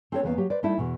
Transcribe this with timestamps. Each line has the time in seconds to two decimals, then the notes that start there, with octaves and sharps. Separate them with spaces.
0.12 C4 D4 E4 A4 B4 C#5
0.23 E2 E3 A#3 B3 C#4 F5
0.38 F#3 G4
0.50 B4 C5 D5
0.63 G3 A3 D#4 E4 A4
0.77 E2 B2 E3